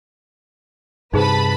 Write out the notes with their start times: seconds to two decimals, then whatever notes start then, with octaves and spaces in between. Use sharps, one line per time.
1.14 G2 C3 D#4 G#4 B4 C5 A5 B5